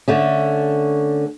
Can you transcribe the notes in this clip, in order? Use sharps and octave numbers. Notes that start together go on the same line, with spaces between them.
D3 A3 C#4